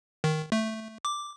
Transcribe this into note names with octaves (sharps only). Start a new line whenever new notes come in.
D#3
A3
D6